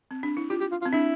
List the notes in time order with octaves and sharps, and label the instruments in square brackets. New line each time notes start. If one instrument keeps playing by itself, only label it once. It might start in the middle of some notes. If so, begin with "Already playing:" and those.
[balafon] C4
D4
E4
[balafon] F4 [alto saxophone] G4
[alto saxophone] G4
F4
F4
[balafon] C4
[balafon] D4 [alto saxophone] E4